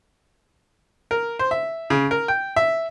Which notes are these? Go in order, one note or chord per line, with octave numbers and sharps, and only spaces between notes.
A#4
C5
E5
C#3
A#4
G5
E5